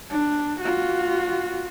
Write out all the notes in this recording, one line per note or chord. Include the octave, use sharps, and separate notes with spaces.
D4
F4 F#4